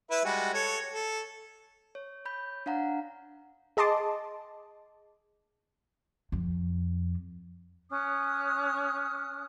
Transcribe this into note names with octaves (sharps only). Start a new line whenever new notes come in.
E4 B4 E5
G3 G#3 F#4
A4 C#5
A4
C#5
C#5 B5 G6
D4 F5 F#5 A#5
G#4 D#5 A5 C6 D6
F2
C#4 D#6 F6 F#6